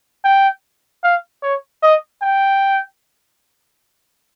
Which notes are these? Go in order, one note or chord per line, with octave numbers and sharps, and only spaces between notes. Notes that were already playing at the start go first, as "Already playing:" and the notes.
G5
F5
C#5
D#5
G5